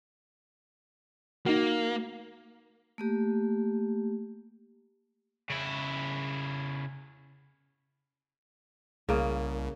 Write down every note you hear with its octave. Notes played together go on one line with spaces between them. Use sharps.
A#3 D#4 F#4
A3 A#3 G4
C#3 E4
C2 C#3 A#3